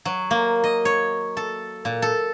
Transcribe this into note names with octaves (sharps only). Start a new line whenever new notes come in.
F#3
A#3
D#5
C#5
A4
A#2
A4